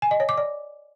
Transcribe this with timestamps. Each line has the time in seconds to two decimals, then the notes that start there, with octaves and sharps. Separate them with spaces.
0.02 G#5
0.11 D#5
0.20 C#5
0.29 D6
0.38 D5